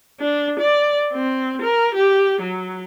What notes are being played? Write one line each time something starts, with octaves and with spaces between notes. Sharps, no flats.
D4
D5
C4
A#4
G4
F#3